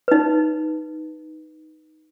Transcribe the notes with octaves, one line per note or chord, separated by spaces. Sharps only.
D#4 B4